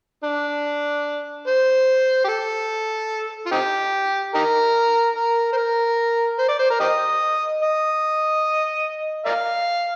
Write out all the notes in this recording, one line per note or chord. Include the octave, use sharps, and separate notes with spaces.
D4
C5
G4
A4
F4
C4 D#4 G4
D#4 G4 A#4
A#4
C5
A#4
C5
D5
C5
A#4
G4 C5 D#5
D#5
A#4 D5 F5